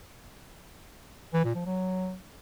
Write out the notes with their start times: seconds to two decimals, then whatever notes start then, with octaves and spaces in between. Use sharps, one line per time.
1.33 E3
1.44 A#2
1.55 F3
1.66 F#3